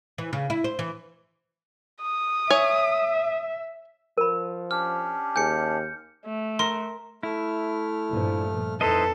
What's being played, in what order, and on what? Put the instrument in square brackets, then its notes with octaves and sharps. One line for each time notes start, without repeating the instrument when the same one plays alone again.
[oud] E3
C#3
E4
C5
E3
[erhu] D#6
[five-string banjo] C#5 G#5 [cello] E5
[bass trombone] F3 [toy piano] A#4 B5
[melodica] C#4 D4 G4 [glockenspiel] F6
[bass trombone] D#2 [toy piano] G#4 G#5 [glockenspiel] G6 C#7
[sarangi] A3
[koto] A#4 [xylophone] C6
[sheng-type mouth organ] A3 F6 [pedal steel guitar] E4
[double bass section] G2 A#2 F3
[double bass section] F2 [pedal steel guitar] D#4 C5 D#5 [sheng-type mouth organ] E4 B4 [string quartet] A4